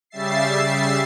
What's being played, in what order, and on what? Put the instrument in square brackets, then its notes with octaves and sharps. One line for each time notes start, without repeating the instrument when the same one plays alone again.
[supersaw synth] C#3 G3 E5 A6 C7